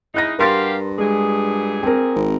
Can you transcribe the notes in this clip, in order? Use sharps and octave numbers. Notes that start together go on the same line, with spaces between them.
C#3 G#3 D#4 E4 F#6 A#6
G2 F#4 G4 A#4 F5 C6 A6
D2 A#2 G#3 G#4
C4 A#4
G#1